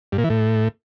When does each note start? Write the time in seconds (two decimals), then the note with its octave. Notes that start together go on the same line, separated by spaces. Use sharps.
0.12 G2
0.18 A#2
0.24 E3
0.30 A2